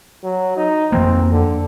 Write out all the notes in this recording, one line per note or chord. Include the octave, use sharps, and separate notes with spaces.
F#3
D#4
F2 E3 A#3 C4
D3